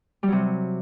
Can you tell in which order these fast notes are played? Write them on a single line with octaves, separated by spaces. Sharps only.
G3 F#3 C3